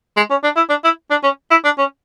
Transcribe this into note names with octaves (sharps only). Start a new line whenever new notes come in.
G#3
C#4
D4
E4
D4
E4
D4
C#4
E4
D4
C#4